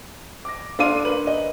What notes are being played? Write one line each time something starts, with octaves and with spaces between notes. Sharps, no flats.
D6 A#6
D4 A4 F5 C6 D6 D#7
A#3 B4 F#7
D#5